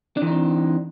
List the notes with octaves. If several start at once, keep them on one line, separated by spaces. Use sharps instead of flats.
E3 C4 D4 D#4